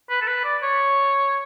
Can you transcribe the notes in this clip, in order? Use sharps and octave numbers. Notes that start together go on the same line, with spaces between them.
B4
A4
B4
D5
C#5